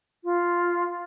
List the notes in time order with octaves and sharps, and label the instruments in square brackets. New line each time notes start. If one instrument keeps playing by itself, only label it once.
[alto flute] F4